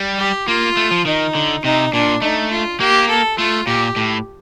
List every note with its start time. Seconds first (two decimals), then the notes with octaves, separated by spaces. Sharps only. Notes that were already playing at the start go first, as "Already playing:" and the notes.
Already playing: G3
0.19 G4
0.48 A#3 F4
0.77 A3
0.91 F3
1.05 D#3 D#4
1.35 D3
1.64 C3 D#4
1.93 A#2 D4
2.22 A3 D#4
2.51 F4
2.80 A#3 G4
3.09 A4
3.38 A3 F4
3.67 A#2 G4
3.96 A2